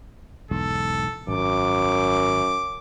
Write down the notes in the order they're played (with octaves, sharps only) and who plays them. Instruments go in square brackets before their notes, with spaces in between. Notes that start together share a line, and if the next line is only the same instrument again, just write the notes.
[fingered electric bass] B1 E2 G#2 [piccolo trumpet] A4
[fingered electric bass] G#1 [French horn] F#2 [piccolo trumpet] D6